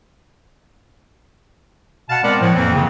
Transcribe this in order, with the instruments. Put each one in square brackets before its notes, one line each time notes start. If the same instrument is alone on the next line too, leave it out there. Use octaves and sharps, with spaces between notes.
[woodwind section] B2 F5 F#5 A5
G#3 B3 C4 A#4 D5 F#5
A2 F3
F2 E3 A#3 C4
C#3